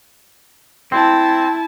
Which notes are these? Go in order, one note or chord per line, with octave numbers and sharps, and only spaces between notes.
C4 E4 A5